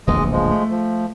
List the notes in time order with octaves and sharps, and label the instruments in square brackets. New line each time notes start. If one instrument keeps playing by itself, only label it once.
[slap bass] D1 A#1 E2 [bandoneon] G#3 D#5
[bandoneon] F3 G#3
[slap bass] A3
[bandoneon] F3